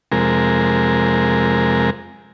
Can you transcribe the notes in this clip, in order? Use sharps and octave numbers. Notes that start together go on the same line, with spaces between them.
F2 C3 G#3 A#4